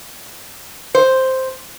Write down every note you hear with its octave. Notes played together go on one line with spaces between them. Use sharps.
C5